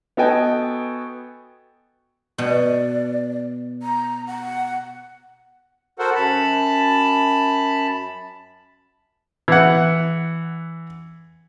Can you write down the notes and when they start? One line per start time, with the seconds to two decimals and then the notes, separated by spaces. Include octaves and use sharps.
0.17 B3 F#4 A4 D#5 G5 G#5
2.38 B2 D5
3.83 A#5
4.27 F#5
5.99 F#4 A4 A#4 C5 F#5
6.15 F#2 A5 B5
9.48 E3 F#5